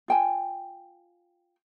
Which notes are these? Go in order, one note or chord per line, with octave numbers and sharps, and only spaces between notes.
F4 G5 G#5